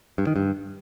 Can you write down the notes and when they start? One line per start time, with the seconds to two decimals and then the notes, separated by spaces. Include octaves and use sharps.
0.18 G2
0.27 D#3
0.36 G2